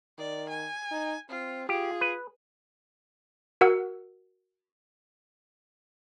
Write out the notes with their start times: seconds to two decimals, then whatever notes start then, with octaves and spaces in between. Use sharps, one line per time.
0.18 D#3 D5
0.49 G#5
0.91 D#4
1.30 C4 F4
1.69 F4 G4 G#4
2.01 B4
3.61 F#4 A#4 F#5 E6